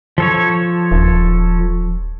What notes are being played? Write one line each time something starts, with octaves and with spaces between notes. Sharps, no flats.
F3 A4 C#5
D#1